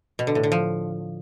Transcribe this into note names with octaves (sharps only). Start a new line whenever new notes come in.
B2
D3
A2
D3
F3